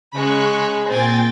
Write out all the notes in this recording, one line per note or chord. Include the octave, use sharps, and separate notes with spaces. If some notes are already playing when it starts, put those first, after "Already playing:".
C#3 G#3 B5 C#6 F#6
A#2 C4 G5 G#5 A6